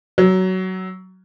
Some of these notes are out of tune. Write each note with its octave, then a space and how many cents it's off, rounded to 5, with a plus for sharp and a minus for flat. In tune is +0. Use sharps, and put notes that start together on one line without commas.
F#3 +15